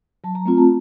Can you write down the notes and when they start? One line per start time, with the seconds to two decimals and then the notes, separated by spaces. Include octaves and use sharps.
0.24 F#3 A5
0.35 A#5
0.46 A3 C4 F4 A#5
0.58 A5